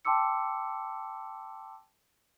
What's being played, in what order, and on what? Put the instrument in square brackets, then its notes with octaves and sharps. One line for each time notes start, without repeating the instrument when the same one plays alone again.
[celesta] G5 A5 C6 D6 E6 C#7